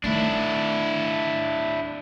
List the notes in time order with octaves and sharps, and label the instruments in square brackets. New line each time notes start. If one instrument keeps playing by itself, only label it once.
[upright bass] D#3 A3 [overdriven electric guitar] D4 E4